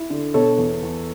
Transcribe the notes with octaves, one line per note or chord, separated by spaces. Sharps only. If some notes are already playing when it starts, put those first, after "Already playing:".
Already playing: E4
D3
B2 A4 C#5
E2
E2